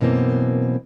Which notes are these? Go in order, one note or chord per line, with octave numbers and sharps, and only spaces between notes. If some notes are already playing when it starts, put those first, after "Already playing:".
F#2 B2 E3 A#3 C4